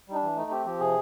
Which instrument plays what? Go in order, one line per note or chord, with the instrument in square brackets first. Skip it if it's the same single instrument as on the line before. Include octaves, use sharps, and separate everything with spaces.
[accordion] G3 D#4
D4
E3
A3 D#4
C4 G4
F3 G4
C3 G#4